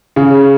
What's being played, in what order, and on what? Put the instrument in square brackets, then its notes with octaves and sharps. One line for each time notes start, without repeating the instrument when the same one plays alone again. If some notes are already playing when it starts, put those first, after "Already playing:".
[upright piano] C#3